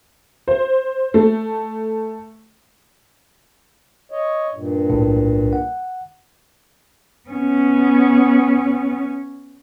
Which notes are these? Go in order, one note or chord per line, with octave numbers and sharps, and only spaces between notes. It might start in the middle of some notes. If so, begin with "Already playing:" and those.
C5
A3
C#5 D#5
G2 A#2
B1 A2
F#5
B3 C#4